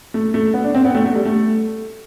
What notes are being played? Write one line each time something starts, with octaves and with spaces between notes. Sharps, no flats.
A3
A3
B3
D4
C4
B3
A3
A3
G3
A3